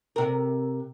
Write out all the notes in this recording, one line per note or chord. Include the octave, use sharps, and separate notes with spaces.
C3 A#4